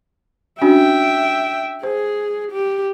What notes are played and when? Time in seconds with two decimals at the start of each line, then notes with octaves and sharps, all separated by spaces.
0.62 C#4 D4 F#4 E5 G5
1.83 G#4 C5
2.52 G4